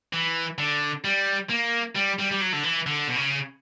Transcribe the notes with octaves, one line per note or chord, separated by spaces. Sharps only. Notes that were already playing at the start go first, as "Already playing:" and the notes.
E3
D3
G3
A#3
G3
G3
G3
F#3
D3
E3
D3
B2
C#3